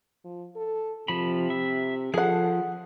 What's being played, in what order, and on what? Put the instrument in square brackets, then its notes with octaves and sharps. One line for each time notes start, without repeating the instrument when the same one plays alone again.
[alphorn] F3
A4
[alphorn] C3 [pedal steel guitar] F3 B5
[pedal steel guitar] E5
[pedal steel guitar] F3 [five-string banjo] G#4 F#5 [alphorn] A4